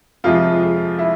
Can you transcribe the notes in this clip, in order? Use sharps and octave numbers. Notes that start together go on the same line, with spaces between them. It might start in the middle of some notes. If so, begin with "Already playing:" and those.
F2 C3 F3 G#3 F4
E4